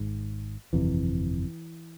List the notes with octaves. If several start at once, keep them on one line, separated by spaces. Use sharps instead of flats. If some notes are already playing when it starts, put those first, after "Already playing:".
Already playing: G#1 G#2
G1 F2 C3 E3